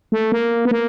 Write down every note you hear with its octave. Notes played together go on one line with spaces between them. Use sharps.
A3
A#3
B3
A#3